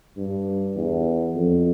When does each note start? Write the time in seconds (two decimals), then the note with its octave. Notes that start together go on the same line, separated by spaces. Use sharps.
0.18 G2
0.76 E2
1.35 F2